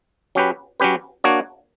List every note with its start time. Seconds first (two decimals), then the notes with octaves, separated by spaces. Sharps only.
0.35 F#3 C#4 G4 B4
0.80 F#3 C#4 G4 B4
1.24 A#3 D4 F#4 C#5